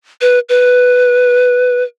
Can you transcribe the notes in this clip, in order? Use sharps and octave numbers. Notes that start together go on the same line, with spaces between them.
B4
B4